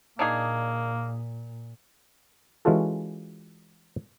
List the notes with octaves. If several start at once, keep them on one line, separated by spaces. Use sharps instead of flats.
A#2 A#3 D4 D#4 G#4
E3 G#3 C#4 F4 F#4 A4